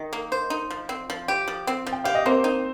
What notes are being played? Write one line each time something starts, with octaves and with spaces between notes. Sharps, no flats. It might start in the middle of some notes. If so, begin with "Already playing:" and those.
Already playing: D#3 D#4
A#3
C5
D#4
F3
C4
F3
G4
F3
C4
F3
G5
G4 F5
D#5
A#3 C4 C5
D#4